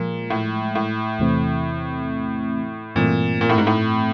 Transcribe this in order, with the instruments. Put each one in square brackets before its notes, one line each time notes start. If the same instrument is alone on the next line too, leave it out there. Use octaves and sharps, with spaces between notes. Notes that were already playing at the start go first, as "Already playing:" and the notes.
Already playing: [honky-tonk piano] A#2 [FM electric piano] F3 G#3
[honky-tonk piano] A2
A2
[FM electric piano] E2 C3 E3 A3 C4
[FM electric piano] G2 E3 A3 C4 [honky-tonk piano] A#2
[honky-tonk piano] A#2
A2
G#2
A2